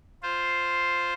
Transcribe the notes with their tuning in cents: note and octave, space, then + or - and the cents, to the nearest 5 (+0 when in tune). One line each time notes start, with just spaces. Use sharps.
F4 +0 C5 +0